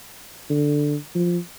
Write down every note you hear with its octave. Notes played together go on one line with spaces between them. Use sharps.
D3
F3